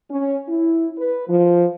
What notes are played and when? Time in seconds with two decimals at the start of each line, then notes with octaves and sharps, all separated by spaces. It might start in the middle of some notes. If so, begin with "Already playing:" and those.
0.11 C#4
0.49 E4
0.98 B4
1.28 F3